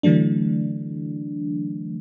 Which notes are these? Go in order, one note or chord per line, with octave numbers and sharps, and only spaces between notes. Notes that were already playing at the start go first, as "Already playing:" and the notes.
D3 E3 F#3 A3 D4